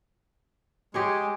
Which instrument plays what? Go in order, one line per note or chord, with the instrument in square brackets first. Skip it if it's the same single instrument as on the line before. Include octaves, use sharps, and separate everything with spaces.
[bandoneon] G#3 [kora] G4 G#4 C#5